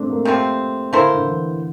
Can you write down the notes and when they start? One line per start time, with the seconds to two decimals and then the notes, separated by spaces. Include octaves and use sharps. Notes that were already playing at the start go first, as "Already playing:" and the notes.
Already playing: A3 C4 D4
0.10 A#3
0.15 A3
0.25 C3 F3 C4
0.92 D3 A#3 E4 A4 C5
1.15 D3
1.26 E3